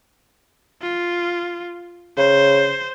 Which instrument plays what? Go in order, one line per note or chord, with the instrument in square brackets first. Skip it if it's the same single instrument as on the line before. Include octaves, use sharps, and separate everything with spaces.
[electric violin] F4
[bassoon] C#3 [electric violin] C5